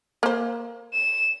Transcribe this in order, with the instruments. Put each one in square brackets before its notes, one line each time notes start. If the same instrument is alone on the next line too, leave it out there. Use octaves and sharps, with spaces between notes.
[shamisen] A#3 C5
[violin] E7